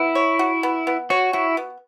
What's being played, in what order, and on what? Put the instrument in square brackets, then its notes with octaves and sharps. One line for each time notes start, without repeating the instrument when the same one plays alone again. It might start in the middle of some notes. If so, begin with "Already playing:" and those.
Already playing: [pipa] B3 [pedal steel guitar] E4
[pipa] C#5
F#4
B3
B3
[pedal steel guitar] F#4 [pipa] C#5
[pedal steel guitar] E4 [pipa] F#4
[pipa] B3